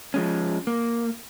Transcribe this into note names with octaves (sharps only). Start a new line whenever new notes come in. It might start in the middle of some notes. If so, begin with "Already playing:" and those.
F3 G#3 C#4
A#3